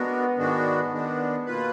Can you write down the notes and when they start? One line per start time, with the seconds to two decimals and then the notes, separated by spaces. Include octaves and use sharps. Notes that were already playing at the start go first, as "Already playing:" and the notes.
Already playing: G#3 B3 D4 F#4 A#4
0.37 G#2 D#3 G#3 D4 F#4
0.91 D#3 G#3 B3 D4
1.46 B2 A#3 F4 B4